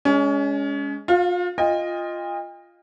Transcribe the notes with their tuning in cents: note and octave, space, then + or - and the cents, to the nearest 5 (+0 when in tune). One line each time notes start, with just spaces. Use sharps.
G#3 +0 C#4 +30
F4 +35 F5 +0
F4 +0 D#5 +0 G5 +45